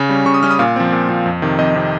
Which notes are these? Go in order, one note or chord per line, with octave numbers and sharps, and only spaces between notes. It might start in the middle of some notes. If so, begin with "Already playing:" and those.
Already playing: C#3
G3 C#4
C#3 C#6
D#6
G3 C#4 F6
D#6
A#2 F5
F3 C4
A#2
F3 C4
F2
C3 D#3
F2 D#5
C3 D#3